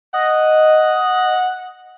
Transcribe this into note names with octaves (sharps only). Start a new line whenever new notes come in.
D#5 F#5